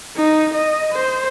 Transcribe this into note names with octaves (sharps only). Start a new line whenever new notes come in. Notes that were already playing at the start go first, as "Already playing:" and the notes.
D#4
D#5
C5